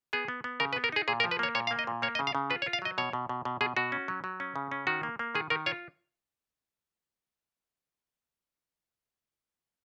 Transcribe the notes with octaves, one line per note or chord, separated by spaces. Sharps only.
B3 G#4
B3
B3
C#3 A#4
B4
B3
A#4
D#4 G#4
A#2 G#4
A#4
F3
B4
A#3 C#5
A#2 C#5
F5
A#3
D#5
A#2
A#3 C#5
D#5
C#3
F5
C#3
F4 B4
C#5
F4
F5
F#3 D#5
B2 C#5
B2
B2
B2
B2 G#4
B2 F#4
C#4
F#3
F#3
C#4
C#3
C#4
D#3 F#4
A#3
A#3
D#3 G#4
D#3 A#4
F4 C#5